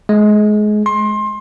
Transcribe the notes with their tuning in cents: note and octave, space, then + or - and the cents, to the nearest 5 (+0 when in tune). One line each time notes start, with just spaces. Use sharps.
G#3 +25
C6 +25